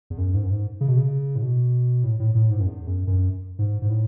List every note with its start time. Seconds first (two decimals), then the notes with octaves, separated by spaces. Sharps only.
0.10 E2
0.18 F#2
0.34 G#2
0.43 F#2
0.50 G#2
0.81 C#3
0.88 B2
0.97 C#3
1.36 A2
1.42 B2
2.03 A2
2.20 A2
2.35 A2
2.50 G#2
2.60 F#2
2.66 E2
2.87 F#2
3.07 F#2
3.59 G#2
3.82 G#2
3.89 A2